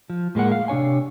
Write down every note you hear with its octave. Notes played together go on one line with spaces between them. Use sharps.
F3
A2 G#3 A#3 F#5
F5
C3 D4 C#5 G#5